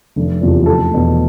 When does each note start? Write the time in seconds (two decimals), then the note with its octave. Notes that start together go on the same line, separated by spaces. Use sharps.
0.16 F1
0.42 E2 C3 F3 A3
0.66 F1 A4
0.91 E2 B2 A3